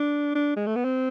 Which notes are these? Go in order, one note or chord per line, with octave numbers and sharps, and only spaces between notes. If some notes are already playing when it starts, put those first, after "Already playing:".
Already playing: D4
D4
G#3
A3
B3
C4